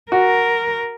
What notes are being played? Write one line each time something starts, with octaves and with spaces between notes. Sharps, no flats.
F#4 A#4